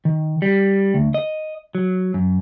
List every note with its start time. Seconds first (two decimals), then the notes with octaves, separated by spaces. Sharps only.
0.05 D#3
0.42 G3
0.94 D2
1.14 D#5
1.75 F#3
2.14 F#2